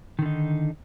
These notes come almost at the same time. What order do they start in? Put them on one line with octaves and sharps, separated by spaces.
D#3 D3 D#4